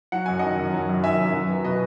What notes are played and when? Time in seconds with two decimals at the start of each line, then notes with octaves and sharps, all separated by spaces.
0.12 F#3 F#5
0.26 F#2 G#5
0.39 D#3 D#5 F#5
0.59 F#2
0.74 F#3
0.89 F#2
1.04 D#3 E5 G#5
1.19 F#2
1.34 F#3
1.49 B3
1.64 B2 B4 D#5